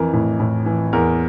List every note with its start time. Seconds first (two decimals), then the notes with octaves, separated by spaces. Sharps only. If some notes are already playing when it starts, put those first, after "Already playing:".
Already playing: F2 E3 A#4
0.13 A2
0.40 A2
0.66 E3
0.93 E2 A#4